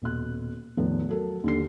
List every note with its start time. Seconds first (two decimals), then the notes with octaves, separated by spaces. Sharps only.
0.02 D#1 B2 F#6
0.77 E2 A2 D#3 F3
1.09 F#3 A4 A#4
1.44 D#2 D3 C7